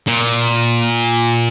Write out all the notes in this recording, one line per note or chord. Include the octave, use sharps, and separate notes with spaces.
A#2